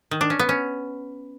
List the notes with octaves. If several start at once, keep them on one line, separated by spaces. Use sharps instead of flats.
D#3
D4
C#4
B3
C#4